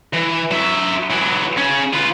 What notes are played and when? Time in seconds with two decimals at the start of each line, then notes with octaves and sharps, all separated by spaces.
0.13 E3
0.51 F#3 E5
1.10 E3 F#3
1.57 C#3 C#4
1.93 F4 B4